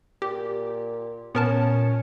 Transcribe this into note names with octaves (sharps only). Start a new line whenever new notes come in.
A#2 G4
A#2 B3 C#4 A#4 A5